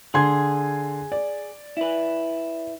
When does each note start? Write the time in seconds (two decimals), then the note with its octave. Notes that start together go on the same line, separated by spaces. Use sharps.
0.14 D3 G#4 C6 G#6
1.12 D5
1.77 E4 B4